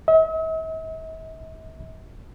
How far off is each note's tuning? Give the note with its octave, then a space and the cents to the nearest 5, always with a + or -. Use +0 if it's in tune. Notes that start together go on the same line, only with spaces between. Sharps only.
E5 -45